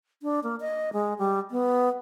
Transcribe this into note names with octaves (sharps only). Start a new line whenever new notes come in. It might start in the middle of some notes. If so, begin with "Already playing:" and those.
D4
A#3
D#5
G#3
G3
B3